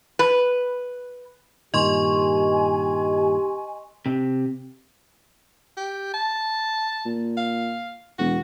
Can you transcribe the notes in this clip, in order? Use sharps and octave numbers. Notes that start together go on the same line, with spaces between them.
B4
G2 A#2 D#3 G4 D#5 G#5 C6 C#6
C3
G4
A5
A#2
F5
E1 F#4